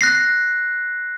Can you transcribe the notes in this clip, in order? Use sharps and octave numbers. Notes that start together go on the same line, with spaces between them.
F#6 A#6 C7